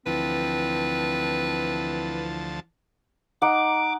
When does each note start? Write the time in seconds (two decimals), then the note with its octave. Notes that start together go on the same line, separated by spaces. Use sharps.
0.06 D2 E3 F3 C4 B4 A5
3.42 D#4 F#5 D6